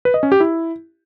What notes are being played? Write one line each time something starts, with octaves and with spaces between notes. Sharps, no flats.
B4
D#5
C#4
G4
E4